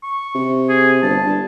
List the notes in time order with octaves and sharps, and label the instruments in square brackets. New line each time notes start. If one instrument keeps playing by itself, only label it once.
[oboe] C#6
[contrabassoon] C3
[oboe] G#4
[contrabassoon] G1 [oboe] A5
[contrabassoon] G2